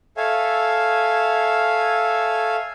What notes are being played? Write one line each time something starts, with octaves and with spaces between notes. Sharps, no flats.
A4 C#5 E5 F5 G#5